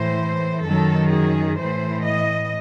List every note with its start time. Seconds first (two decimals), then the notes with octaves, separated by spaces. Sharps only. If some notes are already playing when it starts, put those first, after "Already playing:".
Already playing: A2 E3 C5
0.65 F#2 D#3 F#3 A4
1.11 G#4
1.58 A2 E3 C5
2.05 D#5